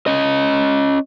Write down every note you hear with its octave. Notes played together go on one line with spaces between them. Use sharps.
C#4 D#5